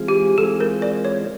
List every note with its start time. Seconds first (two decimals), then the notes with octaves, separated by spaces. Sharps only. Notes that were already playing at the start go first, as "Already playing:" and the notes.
Already playing: E3 G#3 C4 F4 G#4
0.08 G4
0.38 E3 G#3 C4 F4 G#4 A4
0.60 A#4
0.82 D5
1.05 C#5